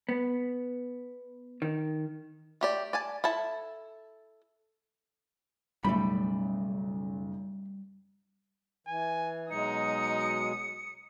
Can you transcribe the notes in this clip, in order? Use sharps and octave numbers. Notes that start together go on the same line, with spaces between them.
B3
D#3
A3 G4 D5
D5 G#5 A5
E4 A4 A5
F#1 B1 G3 A3 B5
E3 G#5
B2 F#3 G#3 D#4 D#6 C#7